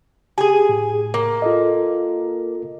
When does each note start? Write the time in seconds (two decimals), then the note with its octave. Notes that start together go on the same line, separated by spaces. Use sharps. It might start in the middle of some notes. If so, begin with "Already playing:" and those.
0.38 G4 G#4 G#5
0.69 A2
1.14 A#3
1.42 F4 A4 D#5